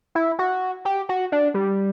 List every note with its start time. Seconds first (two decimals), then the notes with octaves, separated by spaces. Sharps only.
0.15 E4
0.39 F#4
0.85 G4
1.09 F#4
1.32 D4
1.54 G3